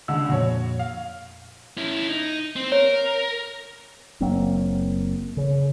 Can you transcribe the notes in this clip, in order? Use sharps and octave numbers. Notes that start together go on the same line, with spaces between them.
C#2 D3 F#5 E6
F2 A#2 F#4 C#5
F5
C#4 E4
D#4
C4
A#4 C#5
F#1 F#3 A#3 C4
C#3